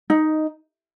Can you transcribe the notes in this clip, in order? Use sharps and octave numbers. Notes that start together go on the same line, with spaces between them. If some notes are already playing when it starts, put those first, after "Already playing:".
D#4